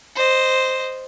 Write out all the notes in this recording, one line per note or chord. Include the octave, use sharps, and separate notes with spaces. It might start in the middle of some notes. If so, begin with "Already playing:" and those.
C5 D#5